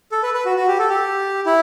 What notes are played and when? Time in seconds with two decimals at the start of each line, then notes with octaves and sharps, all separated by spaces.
0.12 A4
0.23 B4
0.34 B4
0.45 F#4
0.57 F#4
0.68 G4
0.79 A4
0.90 G4
1.46 E4